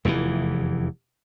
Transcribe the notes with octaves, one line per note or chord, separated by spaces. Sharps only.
F1 E2 B2 E3